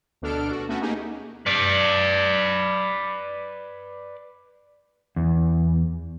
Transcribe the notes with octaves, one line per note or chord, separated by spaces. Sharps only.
D2 B2 D4 A4 F6 D7
F#4
A3 B3 C#4 F#4
A#3 D#4 G4 G#4
B4 D5
E2